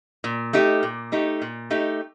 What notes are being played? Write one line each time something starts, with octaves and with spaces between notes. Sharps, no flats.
A#2
A3 D#4 G4
A#2
A3 D#4 G4
A#2
A3 D#4 G4